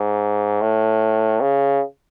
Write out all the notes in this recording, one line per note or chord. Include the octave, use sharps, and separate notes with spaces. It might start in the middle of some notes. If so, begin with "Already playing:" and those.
Already playing: G#2
A2
C#3